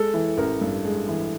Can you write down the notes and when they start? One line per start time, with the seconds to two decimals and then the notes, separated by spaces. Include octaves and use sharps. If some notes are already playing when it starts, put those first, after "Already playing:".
Already playing: G#3 A4
0.14 E3
0.37 A1 A#4
0.61 G2
0.85 G#3
1.08 E3